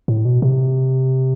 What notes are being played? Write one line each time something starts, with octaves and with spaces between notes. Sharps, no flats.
A2
B2
C3